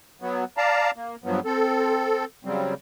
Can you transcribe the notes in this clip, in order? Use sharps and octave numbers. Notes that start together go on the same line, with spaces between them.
F#3 B3
D5 F5 A5 A#5
A#3
G2 F3 F#3 B3
C4 A4
C#3 F#3 G3 C4